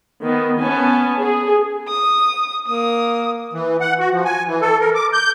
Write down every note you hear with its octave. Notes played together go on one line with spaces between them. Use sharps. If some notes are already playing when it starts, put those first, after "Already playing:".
D#3 B3
B3 C#4 G#5 A5
G#4
D#6
A#3 D#6
E3
F#5
F#4
F3
G#5
E3
A4
A#4
D6
G6